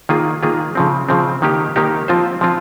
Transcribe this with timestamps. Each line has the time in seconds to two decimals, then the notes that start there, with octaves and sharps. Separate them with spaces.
0.09 D#3 A#3 F4 G#4
0.43 D#3 A#3 F4 G#4
0.75 C#3 F3 C4
1.09 C#3 F3 C4
1.42 D#3 A#3 D#4 G4
1.76 D#3 A#3 D#4 G4
2.08 F3 C4 F4 C5
2.41 F3 C4 F4